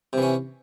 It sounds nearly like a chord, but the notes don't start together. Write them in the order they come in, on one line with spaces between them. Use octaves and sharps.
C3 E3 C#4